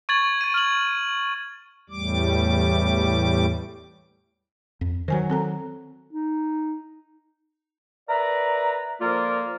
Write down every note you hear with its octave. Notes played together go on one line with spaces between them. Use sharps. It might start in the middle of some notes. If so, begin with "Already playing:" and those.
C#6 G#6 A6 F#7
G#6 D#7
F6 F#7
E2 A2 G3 D6
F2
D#3 F#3 C5 G#5
C4 A4 A#5
D#4
A#4 B4 D5 E5 A#5
F3 A#3 F4 A4 A#4 D5